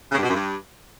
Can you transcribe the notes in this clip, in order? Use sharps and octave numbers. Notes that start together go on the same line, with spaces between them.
C#3
G2
B2
F#2
G2